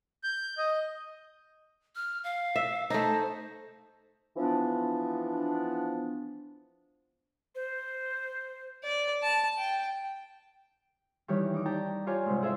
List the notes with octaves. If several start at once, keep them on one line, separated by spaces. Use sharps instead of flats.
G6
D#5
F6
F5
E5
A3 D#4 C5
E3 F3 B3 D4
C5
D5
A5
G5
D#3 E3 G3 G4 C#5
D#4 D6
G4 D5 G5 A5 A#5
F4 G4 C#5 D5 G#5
G#2 C3
E4 G#4 A4 C5 E5 F5